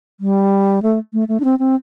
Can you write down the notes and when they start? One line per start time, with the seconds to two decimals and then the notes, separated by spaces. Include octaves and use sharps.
0.20 G3
0.82 A3
1.13 A3
1.28 A3
1.40 D4
1.44 C4
1.59 C4